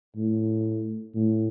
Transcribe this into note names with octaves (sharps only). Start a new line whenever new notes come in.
A2
A2